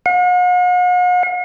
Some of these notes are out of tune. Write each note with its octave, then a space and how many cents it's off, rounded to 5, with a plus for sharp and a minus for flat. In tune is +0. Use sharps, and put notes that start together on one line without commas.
F#5 -45